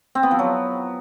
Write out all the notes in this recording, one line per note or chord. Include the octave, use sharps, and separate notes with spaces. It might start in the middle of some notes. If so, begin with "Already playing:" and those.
C4
B3
F3
F#3